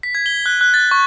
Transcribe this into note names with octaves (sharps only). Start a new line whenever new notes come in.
B6
G#6
G7
F#6
F#6
A6
C#6